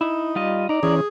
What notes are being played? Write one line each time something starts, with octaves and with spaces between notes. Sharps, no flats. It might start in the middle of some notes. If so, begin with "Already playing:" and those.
D#4 E4
G3 F4 D#5
D#4 D5 A#5
E3 C#4 G#4